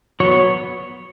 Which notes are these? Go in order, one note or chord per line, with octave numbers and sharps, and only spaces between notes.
F#3 B3 C#5
C#5